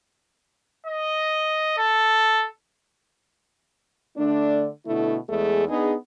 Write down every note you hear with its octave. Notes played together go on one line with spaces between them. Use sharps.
D#5
A4
D3 A3 D4
B2 D3 A3 E4
E2 G#3 A3 G#4
B3 D4 D#4 G#4